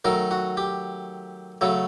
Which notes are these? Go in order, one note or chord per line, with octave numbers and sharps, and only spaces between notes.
D#3 F#3 A3 A#4
F#4
G4
C#3 F#3 A3